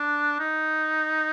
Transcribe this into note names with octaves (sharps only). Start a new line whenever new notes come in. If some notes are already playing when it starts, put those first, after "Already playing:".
Already playing: D4
D#4